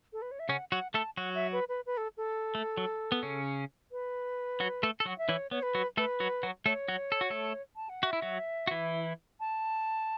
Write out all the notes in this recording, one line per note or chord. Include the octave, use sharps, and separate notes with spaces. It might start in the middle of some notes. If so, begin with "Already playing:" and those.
A4
B4
C#5
E5
C#3 C#4 F#5
F#3 F#4 F#5
A3 A4 A5
F#3 F#4 F#5
E5
B4
B4
B4
A4
A4
A3
F#3
B3
C#3 C#4
B4
F#3 F#4
A3 A4
A4
F#3 F#4 F#5
E5
E3 E4 C#5
B3 C#5
B4
F#3 F#4
A3 A4 B4
F#3 F#4
F#3 F#4
A3 A4 C#5
F#3 F#4
A4
F#4
A3 A4
A5
F#5
F#4 E5
E4
F#3 F#4
F#4
E3 E4
A5